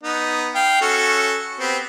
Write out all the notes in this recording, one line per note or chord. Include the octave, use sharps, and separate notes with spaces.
B3 D#4
F5 G5
C#4 F#4 A4
B3 C4 G4